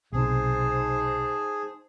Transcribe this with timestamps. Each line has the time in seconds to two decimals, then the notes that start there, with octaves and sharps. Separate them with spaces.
0.13 B1 C3 D#4 G#4 C5 A5